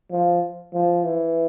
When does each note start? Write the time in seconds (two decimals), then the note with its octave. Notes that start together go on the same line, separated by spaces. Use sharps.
0.12 F3
0.74 F3
1.04 E3